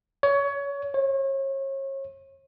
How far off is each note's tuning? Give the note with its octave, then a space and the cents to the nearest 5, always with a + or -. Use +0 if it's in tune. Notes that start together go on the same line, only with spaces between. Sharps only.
C#5 +25
C#5 -35